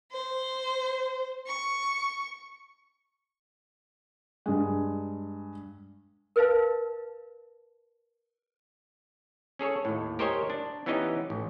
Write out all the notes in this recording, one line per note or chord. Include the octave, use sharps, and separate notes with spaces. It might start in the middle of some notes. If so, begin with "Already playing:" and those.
C5
C#6
G2 G#3
A#4 B4 D#5 F5 A5
C#4 G#4 A4 C#5
D#2 A2
G4 A#4 C5 C#5 D#5 G#5
D4
E3 B3 C#4 D#4 G4 D#5
A1